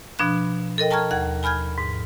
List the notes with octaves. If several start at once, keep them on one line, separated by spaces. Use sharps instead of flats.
B2 F3 D4 B5 F#6
A4 A#4 D#5 G5
G5 A5 A#5 C#6 F6 G#6
D#2 F#5 G#6
G#5 B5 F6 G6 G#6
G#2